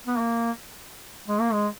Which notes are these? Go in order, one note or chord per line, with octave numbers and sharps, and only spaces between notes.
B3
A#3
G#3
A#3
G#3